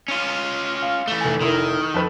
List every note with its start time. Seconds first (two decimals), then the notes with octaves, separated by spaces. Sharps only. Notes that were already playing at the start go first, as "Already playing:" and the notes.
0.08 C#4 F4
0.82 F5
1.08 E3 A3 G7
1.21 F1 G#5
1.41 F1 D#3 E4 A#4
1.94 F2 A4 B4